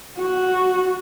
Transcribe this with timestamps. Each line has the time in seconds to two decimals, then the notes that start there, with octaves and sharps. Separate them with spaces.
0.17 F#4